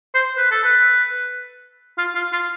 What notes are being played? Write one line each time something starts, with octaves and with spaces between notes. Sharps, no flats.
C5
B4
A4
B4
F4
F4
F4